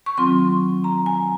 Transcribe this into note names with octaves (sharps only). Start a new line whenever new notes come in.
C#6
D#3 F#3 C4 F4 C6
A#5
G#5